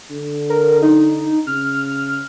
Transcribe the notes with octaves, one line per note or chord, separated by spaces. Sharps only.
D3
A#4
D#4
C#3 F6